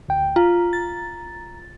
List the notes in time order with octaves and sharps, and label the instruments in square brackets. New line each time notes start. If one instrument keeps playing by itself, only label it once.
[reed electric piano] D2 G5
[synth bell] F4 [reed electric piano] A#5
[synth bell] A6